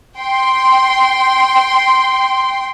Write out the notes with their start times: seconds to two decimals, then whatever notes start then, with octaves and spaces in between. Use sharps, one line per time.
0.19 G5 C6